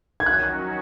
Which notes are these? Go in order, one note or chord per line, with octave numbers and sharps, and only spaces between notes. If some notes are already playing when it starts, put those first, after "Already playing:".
G#6
D#3 F#3 C#4 F#4 F#6